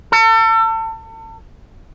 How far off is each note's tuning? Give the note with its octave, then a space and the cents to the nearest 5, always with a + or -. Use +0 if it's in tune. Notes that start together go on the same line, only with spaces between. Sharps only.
A4 +35